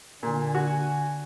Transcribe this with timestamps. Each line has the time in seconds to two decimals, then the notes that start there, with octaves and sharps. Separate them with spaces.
0.23 A#2 D3 G#5
0.55 F#4